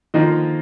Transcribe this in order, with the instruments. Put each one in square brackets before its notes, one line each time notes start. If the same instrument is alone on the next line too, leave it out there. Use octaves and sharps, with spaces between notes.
[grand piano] D3 F3 A#3 F4 [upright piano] D#3 D#4